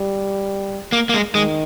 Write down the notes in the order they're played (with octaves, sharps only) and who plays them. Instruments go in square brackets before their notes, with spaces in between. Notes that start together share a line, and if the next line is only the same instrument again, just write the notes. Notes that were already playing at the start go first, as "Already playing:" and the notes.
Already playing: [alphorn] G3
[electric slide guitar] A#3
A#3
G#3
[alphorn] D#3 [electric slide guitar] G#3